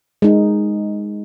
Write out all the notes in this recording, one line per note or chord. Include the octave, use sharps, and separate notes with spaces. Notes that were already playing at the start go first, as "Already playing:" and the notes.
G#3 D#4